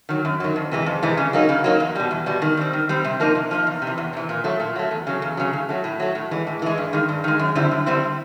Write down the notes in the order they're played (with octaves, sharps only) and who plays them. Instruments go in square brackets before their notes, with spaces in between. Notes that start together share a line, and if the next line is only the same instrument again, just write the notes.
[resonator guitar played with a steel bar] D#3 F#3
F#2
D#3 F#3
F2
C3 E3 G#3
F2
C3 E3 G#3
C#3
F#3 A#3 D#4
C#3
F#3 A#3 D#4
E2
B2 G3
E2
B2 G3
D#3
G3 C4
D#3
G3 C4
C3
F3 A#3 D#4
C3
F3 A#3 D#4
E2
C3
E3
E2
C3 E3
A#2
F#3 A3
A#2
F#3 A3
E2
C#3 F#3
E2
C#3 F#3
A2
F#3 A3
A2
F#3 A3
A2
E3 G#3
A2
E3 G#3
G2
D#3 G#3
G2
D#3 G#3
F#2
D3 G3 C4 E4
F#2
D3 G3 C4 E4